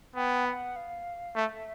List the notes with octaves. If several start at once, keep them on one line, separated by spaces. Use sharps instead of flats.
B3 G5
F#5
F5
A3 E5